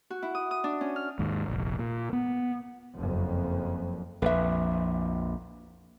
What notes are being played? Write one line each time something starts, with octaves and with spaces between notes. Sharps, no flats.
F#4
E4
D#6
D#6
D4
C#4
F6
D#2 G#2
F1 A#1
A#2
B3
F#1 F2
A#1 F2 B4 E5